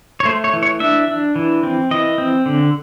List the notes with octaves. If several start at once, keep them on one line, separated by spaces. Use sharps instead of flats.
C#5
A3 C5
C#5
E3
C#5
D4 E5
D4
E3
C4
E3 D#5
C4
D3